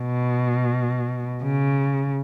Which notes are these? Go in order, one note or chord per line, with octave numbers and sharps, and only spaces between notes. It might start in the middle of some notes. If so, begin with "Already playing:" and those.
Already playing: B2
C#3